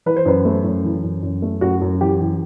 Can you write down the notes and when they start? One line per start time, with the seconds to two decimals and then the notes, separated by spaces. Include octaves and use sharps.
0.06 E3 B4
0.16 C5
0.26 F#2 B4
0.45 A3
0.64 F#2
0.84 E3
1.03 F#2
1.23 F#2
1.42 A3
1.61 F#2 F#4
1.81 F#2
2.01 E3 G4
2.20 E3